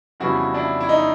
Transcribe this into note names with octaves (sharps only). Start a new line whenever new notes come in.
F2 C#3 E3 G3 B3 E4 F#4
D4 E4
E4
D#4